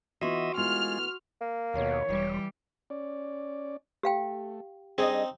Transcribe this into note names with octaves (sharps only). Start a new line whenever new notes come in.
E3 B3 F4 F#4 D#5 E5 C6 C#6
G#3 A3 B3 E4 F4 F6
A#3
D#2 B2 C#5
E1 E3 G3
C#4 D5
A3 G4 F5 G5
G3 C4 D4 D#4 G#4 D#5